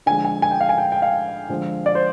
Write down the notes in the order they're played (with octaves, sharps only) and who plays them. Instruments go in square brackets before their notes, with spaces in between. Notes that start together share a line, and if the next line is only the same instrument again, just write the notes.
[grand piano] D3 F3 G#3 G#5
G#5
G#5
G5
F5
G#5
G5
G5
F5
D3 F3 G#3
D5
C5